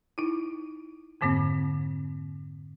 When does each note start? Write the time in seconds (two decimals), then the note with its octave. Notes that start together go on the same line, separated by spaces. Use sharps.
0.18 D#4 E4
1.21 F2 G#2 D3 A#3 C4